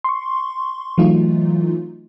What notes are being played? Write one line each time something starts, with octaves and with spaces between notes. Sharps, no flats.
C6 C#6
E3 F#3 A3 D#4 F4